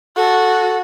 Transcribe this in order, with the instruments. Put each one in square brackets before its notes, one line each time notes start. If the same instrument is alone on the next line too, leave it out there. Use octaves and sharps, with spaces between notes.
[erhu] F#4 [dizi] A4